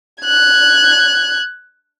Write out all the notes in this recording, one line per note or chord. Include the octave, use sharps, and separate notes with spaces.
F#6 G#6